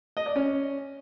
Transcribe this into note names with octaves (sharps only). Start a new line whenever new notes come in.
D#5
D5
C#4